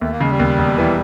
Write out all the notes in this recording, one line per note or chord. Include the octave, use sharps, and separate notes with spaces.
D#2 A3
A#3
C#3 G#3
G3
D#2
E1
E3